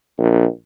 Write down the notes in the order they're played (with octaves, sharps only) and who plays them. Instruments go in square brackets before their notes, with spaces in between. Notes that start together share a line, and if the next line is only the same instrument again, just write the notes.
[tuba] A#1